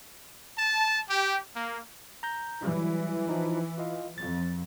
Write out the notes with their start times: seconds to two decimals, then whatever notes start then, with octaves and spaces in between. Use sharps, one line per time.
0.58 A5
1.09 G4
1.56 A#3
2.23 A#5 G6 A#6
2.63 E3 F#3 G3
3.29 F3 D#4
3.78 F4 D#5 F5
4.18 F2 A6